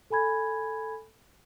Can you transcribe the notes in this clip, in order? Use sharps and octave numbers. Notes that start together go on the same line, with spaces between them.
A4 G#5 B5 G#6